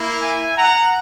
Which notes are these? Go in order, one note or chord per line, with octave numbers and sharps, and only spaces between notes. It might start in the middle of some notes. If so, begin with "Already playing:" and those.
Already playing: A#3 E4
E5 G#5
F#5 A#5